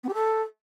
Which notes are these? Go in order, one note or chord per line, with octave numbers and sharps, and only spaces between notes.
B3
G4
A4